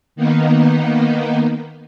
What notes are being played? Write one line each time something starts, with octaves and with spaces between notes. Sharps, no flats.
D#3 A#3 B3 D#4